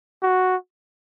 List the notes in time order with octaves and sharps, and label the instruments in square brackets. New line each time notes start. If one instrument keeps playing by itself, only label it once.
[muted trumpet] F#4